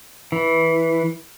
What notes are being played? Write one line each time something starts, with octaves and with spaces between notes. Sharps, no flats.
E3